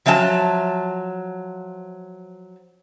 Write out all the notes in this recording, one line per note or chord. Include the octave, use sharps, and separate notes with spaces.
F3 F#3 E5 F#5 A5